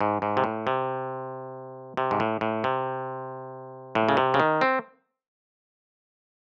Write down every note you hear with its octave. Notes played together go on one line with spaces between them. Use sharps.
G#2
G#2
C3
A2
C3
C3
G#2
A2
A2
C3
A2
C#3
C3
C#3
D#3
C4